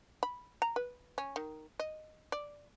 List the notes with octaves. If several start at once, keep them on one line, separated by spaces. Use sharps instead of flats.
B5
A#5
B4
C#4
D#3
D#5
D5